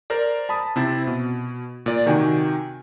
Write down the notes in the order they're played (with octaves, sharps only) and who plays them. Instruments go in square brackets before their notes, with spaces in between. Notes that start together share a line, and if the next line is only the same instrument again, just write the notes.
[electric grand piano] A#4 C5 D5
A5 B5 D#6
C3 C4 E4 A6
B2
A#2 D5
C3 D#3 F#4 G5 G#5